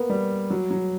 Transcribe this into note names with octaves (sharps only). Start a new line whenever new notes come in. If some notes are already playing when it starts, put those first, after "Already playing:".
Already playing: A#3 B3
G3
F#3
F#3